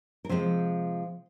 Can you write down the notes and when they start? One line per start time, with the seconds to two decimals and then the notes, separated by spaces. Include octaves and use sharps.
0.25 A#4
0.29 C3 F3 G#3 C4 C5